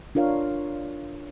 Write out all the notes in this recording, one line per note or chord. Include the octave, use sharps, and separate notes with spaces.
D4 F4 A#4 C#5 F5